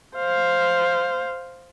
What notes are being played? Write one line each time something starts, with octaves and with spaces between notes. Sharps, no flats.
C5 F5